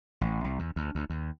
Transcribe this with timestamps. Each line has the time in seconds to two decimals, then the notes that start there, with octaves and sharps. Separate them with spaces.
0.21 A1
0.44 C2
0.59 E2
0.76 D2
0.95 D2
1.10 D#2